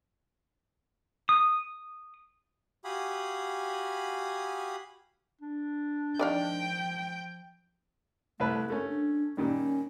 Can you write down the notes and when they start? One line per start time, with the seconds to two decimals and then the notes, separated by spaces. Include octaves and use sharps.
1.29 D#6
2.84 F#4 G4 F5 G#5 B5 D#6
5.41 D4
6.19 D#3 F3 D5 F5 G5
8.40 C2 A3 B4 A5
8.70 A3 C#4 A#4
8.88 D4
9.37 A#2 D#3 G3 C#4